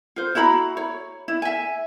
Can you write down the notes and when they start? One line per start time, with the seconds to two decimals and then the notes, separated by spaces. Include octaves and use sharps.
0.16 F4 C5
0.35 E4 F#4 A#5 B5
0.77 C#5
1.28 E4
1.42 E5 G#5